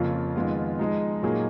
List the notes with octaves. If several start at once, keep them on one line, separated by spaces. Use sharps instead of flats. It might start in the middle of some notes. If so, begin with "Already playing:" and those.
Already playing: F2 C#3 F3 A#3 F4
F2 D#3 G#3 B3 F4
F3 G#3 D#4
A#2 F#3 A#3 D#4 G#4